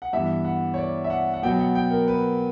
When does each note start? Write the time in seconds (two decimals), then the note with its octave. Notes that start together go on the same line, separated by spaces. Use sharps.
0.02 F#5
0.13 G2 E3 B3 E5
0.45 F#5
0.74 C#5
0.78 D5
1.04 E5
1.10 F#5
1.34 F#5
1.43 B2 F#3 B3 G5
1.59 F#5
1.75 G5
1.91 A#4
2.08 B4